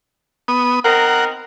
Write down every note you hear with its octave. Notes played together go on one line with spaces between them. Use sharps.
B3 D#6
C4 D#4 A#4 F#5 A#5